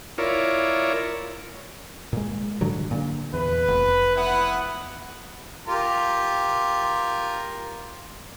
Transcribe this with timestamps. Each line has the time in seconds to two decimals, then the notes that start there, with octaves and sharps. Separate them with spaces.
0.18 E4 F4 A#4 C#5 D5
2.13 A#2 G#3
2.61 G#2 D3 F#3
2.91 A#2 D3
3.34 E2 B4
3.68 F1
4.16 B3 E4 F#5
5.68 F4 G4 A#4